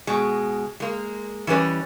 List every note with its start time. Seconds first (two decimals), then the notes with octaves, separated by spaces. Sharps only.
0.07 B2 G#3
0.80 G#3 A#3
1.47 E3 G3 C#4 B4 D#5